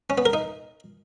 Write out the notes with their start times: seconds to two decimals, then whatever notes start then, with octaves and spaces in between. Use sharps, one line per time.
0.10 C#4
0.18 B3
0.26 A#4
0.33 D#4